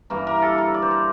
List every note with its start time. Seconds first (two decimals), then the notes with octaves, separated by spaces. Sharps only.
0.10 G2 E3 A#3 A#4
0.27 A#4
0.42 A4
0.58 A#4
0.74 D5
0.82 C5
0.91 A#4